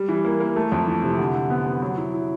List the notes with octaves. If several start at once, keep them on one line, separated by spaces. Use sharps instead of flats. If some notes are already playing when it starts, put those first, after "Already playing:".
Already playing: G3
E3
A#3
A#3
A3
F2
E3
C3
D3
D3
B3
B3
F#3
E4
E4